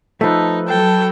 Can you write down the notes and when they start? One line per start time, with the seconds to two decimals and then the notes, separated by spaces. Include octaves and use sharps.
0.21 F3 A3 D#4 A4 B4
0.68 F#3 A4 G5 A5